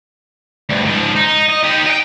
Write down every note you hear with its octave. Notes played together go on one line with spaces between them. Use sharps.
D2 G2
G#2 F3
D#4
D#5
D#4 G4
D#5 G5